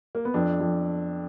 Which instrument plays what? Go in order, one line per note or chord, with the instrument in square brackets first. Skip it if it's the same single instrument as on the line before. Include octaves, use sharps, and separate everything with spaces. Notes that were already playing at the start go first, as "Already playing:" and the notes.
[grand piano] A#3
B3
[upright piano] F2 [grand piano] D4
[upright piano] F2